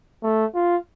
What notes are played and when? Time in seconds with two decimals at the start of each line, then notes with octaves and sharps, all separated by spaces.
0.23 A3
0.55 F4